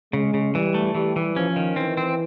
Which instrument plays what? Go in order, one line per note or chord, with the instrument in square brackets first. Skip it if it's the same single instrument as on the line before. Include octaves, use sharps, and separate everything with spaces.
[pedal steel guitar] C#3 [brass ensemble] G#3
[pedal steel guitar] C#3
[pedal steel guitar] E3 [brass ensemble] G3
[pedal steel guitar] A3
[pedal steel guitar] E3 [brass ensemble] G3
[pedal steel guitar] E3
[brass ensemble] F3 [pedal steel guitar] C#4
[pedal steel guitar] D#3
[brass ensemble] E3 [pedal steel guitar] C4
[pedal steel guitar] C4